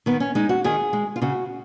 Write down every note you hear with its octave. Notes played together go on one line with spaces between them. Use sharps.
D#3 B3
C#4
G#3 D#4
F#4
D#3 G#4
G#3
F4
C#3 F#4